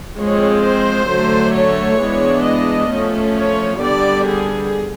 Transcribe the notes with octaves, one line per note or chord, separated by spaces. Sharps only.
F3 G#3 C4 C#5
C5
D3 F#3 A3
C#5
E3 G#3 B3 D4
D#5
F3 A3 C#4
C#5
D3 G3 B3 D5
G#4